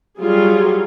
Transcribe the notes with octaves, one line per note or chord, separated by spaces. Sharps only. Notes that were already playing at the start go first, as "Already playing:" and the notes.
F#3 G3 F4 G#4